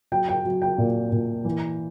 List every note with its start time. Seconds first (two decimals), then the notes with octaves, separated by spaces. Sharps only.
0.12 F#3 G5
0.28 G5
0.45 F#3
0.62 G5
0.78 A#2
1.12 A#2
1.45 E3